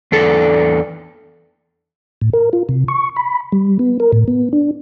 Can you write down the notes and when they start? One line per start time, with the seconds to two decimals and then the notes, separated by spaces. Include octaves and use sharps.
0.12 E2 D4 A4
2.22 A2
2.33 A#4
2.53 F4
2.69 C3
2.88 C#6
3.17 B5
3.52 G3
3.79 B3
4.00 A#4
4.13 A2
4.28 B3
4.53 D4